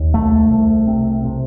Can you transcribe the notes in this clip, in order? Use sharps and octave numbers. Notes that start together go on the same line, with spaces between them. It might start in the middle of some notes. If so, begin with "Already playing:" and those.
Already playing: D#2
C2 A3
C2
C3
C3